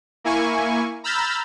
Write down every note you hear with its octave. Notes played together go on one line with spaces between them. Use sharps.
A#3 E4 G#5 C#6
A#5 B5 E6 F6 G6 A6